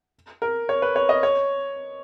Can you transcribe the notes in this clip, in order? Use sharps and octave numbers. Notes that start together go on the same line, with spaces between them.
A#4
C#5
B4
C#5
D#5
C#5